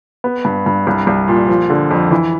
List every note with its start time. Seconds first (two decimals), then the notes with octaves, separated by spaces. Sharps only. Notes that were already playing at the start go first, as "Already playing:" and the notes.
0.24 B3
0.45 G2
0.66 G2
0.87 C2
1.07 C2
1.28 A#2
1.48 F3
1.70 D3
1.91 F2
2.11 E3